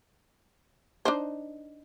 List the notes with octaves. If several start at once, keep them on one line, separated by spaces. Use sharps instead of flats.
D4 D#4 C5